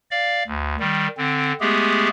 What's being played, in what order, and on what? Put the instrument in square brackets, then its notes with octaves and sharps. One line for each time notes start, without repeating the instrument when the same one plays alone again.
[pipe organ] D5 F5
D2
D#3 G3
D3 C4
G#3 A3 B3 G4 G#4